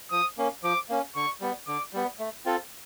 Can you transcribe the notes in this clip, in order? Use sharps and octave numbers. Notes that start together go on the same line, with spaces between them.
F3 D#6
A#3 C#4
F3 D6
A#3 C#4
D3 C#6
G3 B3
D3 D6
G3 B3
A3
C4 F4 A4